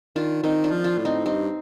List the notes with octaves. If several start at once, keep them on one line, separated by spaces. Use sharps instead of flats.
D#3 D4 F4
D#3 C4 D#4
D4 F4
F3
D4 F4
A2
C4 D#4
G2 C4 D#4